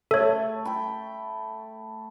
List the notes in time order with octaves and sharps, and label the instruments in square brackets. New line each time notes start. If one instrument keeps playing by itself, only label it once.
[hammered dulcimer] A3 [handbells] A4 C#5
[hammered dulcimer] G5 B5